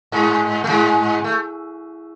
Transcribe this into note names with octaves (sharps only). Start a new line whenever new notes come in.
G#2 G#3
A3
G#2 G#3
A3